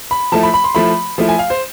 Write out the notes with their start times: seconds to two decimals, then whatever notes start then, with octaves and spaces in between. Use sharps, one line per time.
0.11 B5
0.32 F3 A3 E4 A5
0.43 B5
0.54 B5
0.64 C6
0.75 F3 A3 E4 B5
1.18 F3 A3 E4
1.29 G#5
1.39 F5
1.50 C5